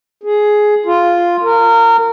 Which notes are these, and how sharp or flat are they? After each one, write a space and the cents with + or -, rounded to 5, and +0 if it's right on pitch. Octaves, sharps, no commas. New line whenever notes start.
G#4 +10
F4 +0
A#4 -25